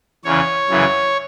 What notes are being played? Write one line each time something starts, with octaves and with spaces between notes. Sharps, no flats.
E2 C#3 E3 C#5
F#2 C#3 E3